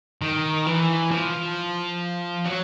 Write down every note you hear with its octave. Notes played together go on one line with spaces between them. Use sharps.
D#3
E3
F3
F#3